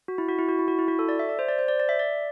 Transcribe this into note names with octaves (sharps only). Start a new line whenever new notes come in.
F#4
E4
F#4
E4
F#4
E4
F#4
E4
F#4
A4
D5
E5
D5
C5
D5
C5
D5
D5
E5
D5